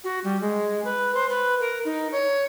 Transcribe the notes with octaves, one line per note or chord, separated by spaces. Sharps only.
F#4
G3
G#3
B4
C5
B4
A#4
D#4
C#5